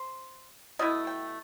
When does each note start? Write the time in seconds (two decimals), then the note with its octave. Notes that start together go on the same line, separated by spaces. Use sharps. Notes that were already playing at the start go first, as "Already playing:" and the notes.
Already playing: C5
0.79 B2 A3 E4 D#5
1.07 G5